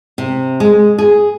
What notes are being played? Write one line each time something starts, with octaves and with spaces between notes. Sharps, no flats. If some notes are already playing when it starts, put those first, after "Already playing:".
C3
G#3
G#4